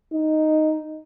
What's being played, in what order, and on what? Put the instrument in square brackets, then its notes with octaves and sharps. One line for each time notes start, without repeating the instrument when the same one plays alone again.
[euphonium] D#4